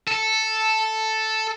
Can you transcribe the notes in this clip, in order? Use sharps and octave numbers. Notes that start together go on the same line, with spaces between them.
A4